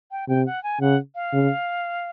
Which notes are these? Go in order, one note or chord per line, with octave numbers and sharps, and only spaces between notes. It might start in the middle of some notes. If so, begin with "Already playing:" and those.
G5
C3 G5
F#5
G#5
C#3 F#5
F5
C#3